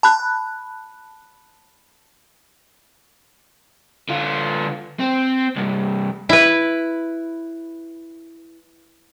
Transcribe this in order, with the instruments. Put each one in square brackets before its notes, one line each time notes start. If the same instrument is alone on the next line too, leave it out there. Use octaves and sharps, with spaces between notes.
[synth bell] A5 B5 F#6
[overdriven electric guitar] D3 F4
C4
C2 G2
[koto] E4 B4